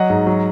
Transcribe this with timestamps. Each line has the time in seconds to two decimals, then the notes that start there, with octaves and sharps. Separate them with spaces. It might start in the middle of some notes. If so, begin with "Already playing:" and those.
Already playing: F#3 D#5 F#5
0.10 G#2
0.27 F#3